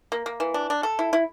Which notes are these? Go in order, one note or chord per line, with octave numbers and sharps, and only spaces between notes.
A#3
A#3
E3
D4
D4
A4
E4
E4